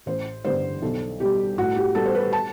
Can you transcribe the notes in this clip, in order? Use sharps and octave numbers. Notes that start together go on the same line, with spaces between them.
A1 C5
G2 D3 G3 B3 C5
B1 A4
B2 G3 G4
A2 F#4
G4
G3 B3 A4
C5
B4
A5